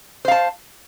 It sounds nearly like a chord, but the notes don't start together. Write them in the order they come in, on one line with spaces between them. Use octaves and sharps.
C5 F5 A5